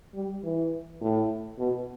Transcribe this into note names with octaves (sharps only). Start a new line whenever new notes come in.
G3
E3
A2
B2